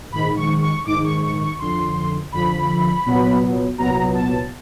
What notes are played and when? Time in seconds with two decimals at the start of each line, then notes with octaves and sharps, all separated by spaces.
0.12 A#1 G#2 D#3 B5
0.37 C#6
0.62 C#6
0.85 A#1 G#2 D#3 D6
1.04 C#6
1.23 C#6
1.41 C#6
1.59 F2 D3 F3 C6
2.32 F2 D3 F3 B5
3.05 C2 A#2 F#3 B3
3.78 C2 A#2 F#3 B3 A#5
4.15 A5